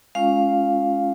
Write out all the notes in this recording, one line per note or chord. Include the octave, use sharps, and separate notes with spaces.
G#3 C#4 F4 F5